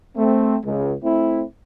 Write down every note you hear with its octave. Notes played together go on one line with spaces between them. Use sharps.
A3 C4
C#2
A3 C4 E4